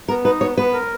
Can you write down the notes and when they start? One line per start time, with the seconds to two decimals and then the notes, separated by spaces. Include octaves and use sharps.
0.08 B3 A#4
0.24 D#4 B4
0.41 B3 C#5
0.57 B3 B4
0.73 A#4